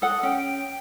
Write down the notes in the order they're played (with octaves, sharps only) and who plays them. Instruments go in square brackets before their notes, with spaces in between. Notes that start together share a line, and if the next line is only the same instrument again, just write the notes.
[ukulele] A4 F#5 [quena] D#6
[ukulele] C#4 [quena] G5